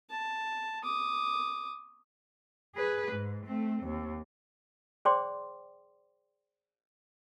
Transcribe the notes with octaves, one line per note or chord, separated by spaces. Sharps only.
A5
D6 D#6
G#4 B4
G#2
A3 C4
D#2
G#4 C5 D5 G5 C6 D6